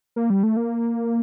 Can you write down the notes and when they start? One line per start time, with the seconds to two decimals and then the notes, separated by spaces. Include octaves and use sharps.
0.16 A#3
0.30 G3
0.43 A3
0.57 A#3